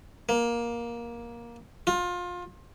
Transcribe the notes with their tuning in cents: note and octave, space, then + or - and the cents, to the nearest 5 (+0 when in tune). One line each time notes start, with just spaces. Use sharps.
A#3 +15
F4 +25